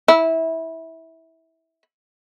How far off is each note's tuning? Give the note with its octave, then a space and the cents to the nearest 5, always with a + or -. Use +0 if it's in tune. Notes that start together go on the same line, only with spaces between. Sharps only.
E4 -20